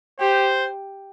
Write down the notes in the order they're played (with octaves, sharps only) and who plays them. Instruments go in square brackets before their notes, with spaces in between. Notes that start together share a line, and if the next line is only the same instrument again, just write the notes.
[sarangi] G4 [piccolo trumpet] C5